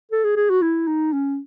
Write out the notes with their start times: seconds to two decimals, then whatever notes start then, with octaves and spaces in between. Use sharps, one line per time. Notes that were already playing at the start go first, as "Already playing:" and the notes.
0.12 A4
0.24 G#4
0.36 G#4
0.50 F#4
0.62 E4
0.87 D#4
1.13 C#4